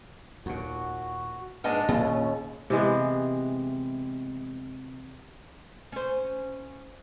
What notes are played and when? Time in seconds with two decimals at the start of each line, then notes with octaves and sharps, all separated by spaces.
0.46 D#2 A#2 F#4
1.64 G#2 G#3 D4 G#4 D5 D#5 F#5 F6
1.89 D#2 A#2 C#3 A#3 C#4 G#4
2.70 C3 E3 G#3 B3
5.92 C#4 C5